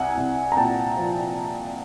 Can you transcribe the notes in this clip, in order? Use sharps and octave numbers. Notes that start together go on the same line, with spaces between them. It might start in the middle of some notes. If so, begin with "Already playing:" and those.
Already playing: C2 F#5 G#5
C2
A#5
A#2 G5 A5
F3